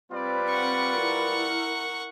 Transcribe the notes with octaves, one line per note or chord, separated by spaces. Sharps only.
G3 C4 F4 B4 D5
F#5 C#6
E4 A#4